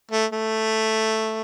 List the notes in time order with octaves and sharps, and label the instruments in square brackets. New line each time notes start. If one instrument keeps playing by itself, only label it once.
[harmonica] A3
A3